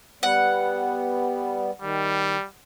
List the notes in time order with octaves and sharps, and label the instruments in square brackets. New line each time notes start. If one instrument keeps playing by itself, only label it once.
[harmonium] G3 B3 [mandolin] F#5
[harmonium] D#3 [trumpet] G3